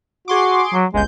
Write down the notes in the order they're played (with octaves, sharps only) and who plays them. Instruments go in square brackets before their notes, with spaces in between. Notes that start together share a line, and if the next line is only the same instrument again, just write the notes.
[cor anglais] F#4 [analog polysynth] G#4 C6 D6
[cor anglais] F#3
[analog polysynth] G1 C#2 G6 [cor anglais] G#3